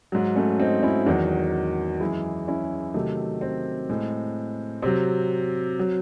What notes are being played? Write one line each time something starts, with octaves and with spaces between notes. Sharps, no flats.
G#2 F#3
A3 C#4
C4 D#4
C#4 E4
E2 D#3 F#3 D#4 F#4
F#2 E3 G#3 E4 G#4
C#4 E4
C3 D#3 F#3 A3
C4
A2 G#3
C3 F#3 C4
F#3